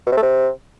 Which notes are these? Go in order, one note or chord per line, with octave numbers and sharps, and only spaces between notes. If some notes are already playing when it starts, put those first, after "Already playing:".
B2
C3
A3
C3